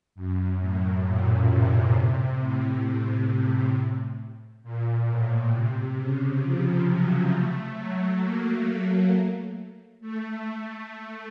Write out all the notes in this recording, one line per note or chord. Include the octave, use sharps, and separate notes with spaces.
F#2
A2
A#2
C3
C3
A2
A2
A#2
A2
C3
C#3
F3
F#3
A3
F#3
A#3
A3